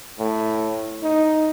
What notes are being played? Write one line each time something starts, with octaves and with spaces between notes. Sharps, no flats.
A2
D#4